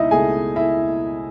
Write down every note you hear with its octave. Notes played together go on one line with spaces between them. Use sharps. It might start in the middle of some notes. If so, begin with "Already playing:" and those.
Already playing: C#2 B2 D#4 E4 D#5 E5
C#2 B2 A3 G#4 G#5
E4 E5